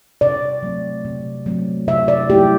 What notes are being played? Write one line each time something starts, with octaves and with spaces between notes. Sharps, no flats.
C3 D5
F#3 A3 C4
C3
F#3 A3 C4
C3 E5
D5
F#3 A3 E4 G4